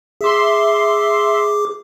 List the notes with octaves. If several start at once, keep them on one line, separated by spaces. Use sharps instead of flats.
G#4 E5 C6 D6